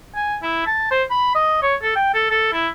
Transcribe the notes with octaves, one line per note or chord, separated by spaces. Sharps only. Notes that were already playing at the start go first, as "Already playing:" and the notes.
G#5
E4
A5
C5
B5
D#5
C#5
A4
G5
A4
A4
E4